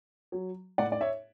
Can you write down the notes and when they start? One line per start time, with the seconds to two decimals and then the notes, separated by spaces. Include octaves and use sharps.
0.32 F#3
0.78 A2 D5 F#5
0.92 D5
1.01 C#5 E5